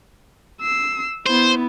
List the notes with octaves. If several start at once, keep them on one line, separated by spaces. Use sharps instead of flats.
E6 C7
B3 E4 C5